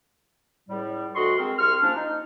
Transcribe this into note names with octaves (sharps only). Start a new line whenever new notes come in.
C#2 A2 G3
D2 F#4 D#5 C6 C#6
G#3 C4 A#4
C2 C6 C#6 F6
F3 A#3 C#4 D4
D#4